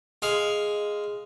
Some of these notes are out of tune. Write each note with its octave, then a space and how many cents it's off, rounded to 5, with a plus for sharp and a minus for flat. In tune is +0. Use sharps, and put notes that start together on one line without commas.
G#3 +0 F5 +0